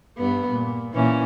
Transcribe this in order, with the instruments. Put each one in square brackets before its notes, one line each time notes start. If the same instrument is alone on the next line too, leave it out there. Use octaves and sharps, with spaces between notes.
[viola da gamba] G2 B3
A#2
A#2 E3 C#4